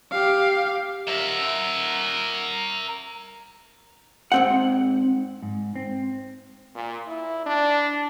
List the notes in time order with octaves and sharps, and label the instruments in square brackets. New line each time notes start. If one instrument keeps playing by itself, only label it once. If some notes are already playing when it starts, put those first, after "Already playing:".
[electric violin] G4 F5
[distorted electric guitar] A#4 E5
[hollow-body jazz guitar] G#2 C4 F#5
[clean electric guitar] G#2
C4
[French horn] A#2
E4
D4